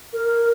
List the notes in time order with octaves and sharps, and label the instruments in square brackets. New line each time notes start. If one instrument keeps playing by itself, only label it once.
[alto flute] A#4